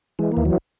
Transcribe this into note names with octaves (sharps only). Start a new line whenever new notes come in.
E3 G#3
A#3
D#2
F#3